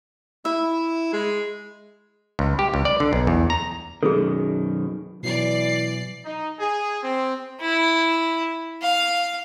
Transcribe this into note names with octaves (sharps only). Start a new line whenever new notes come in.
E4 E5
G#3
C#2
G4
C#2
D5
D3
B1
E2
A#5
F#2 B2 D#3 G#4 A4
B2 E3 F#3 D5 C7
D#4
G#4
C4
E4
F5